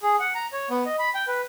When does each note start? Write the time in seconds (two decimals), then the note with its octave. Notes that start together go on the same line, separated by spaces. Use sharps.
0.02 G#4
0.20 F#5
0.35 A#5
0.53 C#5
0.70 B3
0.86 D#5
0.99 B5
1.15 G5
1.27 B4